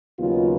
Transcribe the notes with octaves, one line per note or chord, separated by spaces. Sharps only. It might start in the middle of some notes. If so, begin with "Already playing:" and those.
D#2 C#3 F#3 B3 D#4 F4